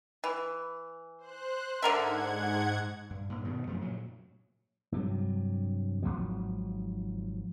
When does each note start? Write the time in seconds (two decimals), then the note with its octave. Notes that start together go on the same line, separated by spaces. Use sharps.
0.24 E3
1.18 C5 F#6
1.82 G#2 D3 A#4 E5 F#5 G#6
3.10 G2
3.29 G2 A#2
3.45 G2 B2 D#3
3.67 F#2 F3 A3
3.81 A#2 C#3 F#3
4.92 G2 C3 F#3
6.02 G#1 E2 F3 F#3